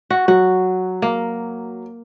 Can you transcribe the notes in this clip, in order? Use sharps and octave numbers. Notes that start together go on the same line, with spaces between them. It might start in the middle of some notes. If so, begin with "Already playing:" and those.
F#4
F#3 F#4
A#3